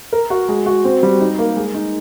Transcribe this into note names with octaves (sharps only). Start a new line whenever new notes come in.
A#4
F#4
G#3
F#4
C4
G3
D#4
A#3
G#3
D#4